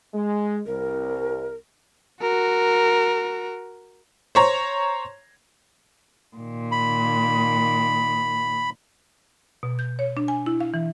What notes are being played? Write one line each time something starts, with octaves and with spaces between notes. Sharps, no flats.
G#3
C2 A#4
F#4 A#4
C5 C#5 A#5
A#2 D#3
B5
B2
G6
C#5
D4
G#5
E4
F5
E3